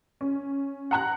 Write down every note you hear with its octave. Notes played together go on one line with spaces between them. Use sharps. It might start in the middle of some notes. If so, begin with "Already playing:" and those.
C#4
F#5 A#5 F#6